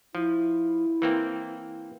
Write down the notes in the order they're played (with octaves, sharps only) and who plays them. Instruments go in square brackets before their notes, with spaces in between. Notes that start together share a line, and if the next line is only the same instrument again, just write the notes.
[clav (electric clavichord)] F3 [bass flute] E4
[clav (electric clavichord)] E3 A#3 C4